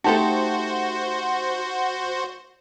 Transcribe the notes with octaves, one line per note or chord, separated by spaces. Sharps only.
A3 D#4 F#4 G4 A4 C5 A5